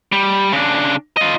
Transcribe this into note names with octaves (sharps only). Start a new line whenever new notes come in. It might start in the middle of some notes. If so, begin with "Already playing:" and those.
G3
C#3 D4
F4 D#5